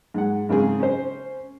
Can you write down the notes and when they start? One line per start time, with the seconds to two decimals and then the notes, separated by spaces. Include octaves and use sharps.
0.14 G#2 F#5
0.49 G#2 C#3 C4 G#4
0.80 C#4 C5